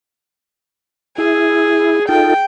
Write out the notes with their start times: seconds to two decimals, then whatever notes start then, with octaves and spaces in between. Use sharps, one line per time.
1.18 E4 G#4
2.09 D#4 F4 A4 G5